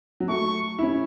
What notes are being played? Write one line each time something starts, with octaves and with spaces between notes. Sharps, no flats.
F#3
A3 C#6
E4
C#4